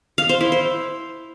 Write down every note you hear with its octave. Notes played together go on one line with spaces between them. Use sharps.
F5
C5
E4
C5